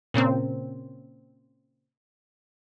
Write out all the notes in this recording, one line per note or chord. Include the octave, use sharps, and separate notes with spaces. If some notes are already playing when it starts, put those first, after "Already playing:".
A#2 C#3 A#3 C4